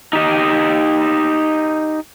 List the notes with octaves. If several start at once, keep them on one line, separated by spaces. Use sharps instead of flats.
D#4 G4 D#5